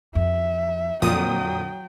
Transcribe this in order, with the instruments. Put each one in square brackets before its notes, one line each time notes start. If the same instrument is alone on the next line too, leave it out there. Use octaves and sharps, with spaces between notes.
[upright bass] F2 [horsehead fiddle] E5
[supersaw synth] F2 A#2 D#6 [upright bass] D3 [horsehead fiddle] F#3 G5